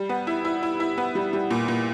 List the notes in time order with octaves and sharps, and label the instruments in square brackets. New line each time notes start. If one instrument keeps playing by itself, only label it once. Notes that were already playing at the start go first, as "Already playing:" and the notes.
Already playing: [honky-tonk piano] G3
B3
E4
E4
E4
E4
B3
G3
G3
A#2
A#2